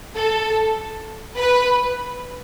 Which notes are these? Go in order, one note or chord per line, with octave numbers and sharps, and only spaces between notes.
A4
B4